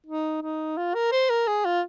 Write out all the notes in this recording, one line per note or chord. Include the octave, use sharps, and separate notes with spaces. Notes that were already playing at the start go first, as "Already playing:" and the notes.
D#4
D#4
F4
A#4
C5
A#4
G#4
F4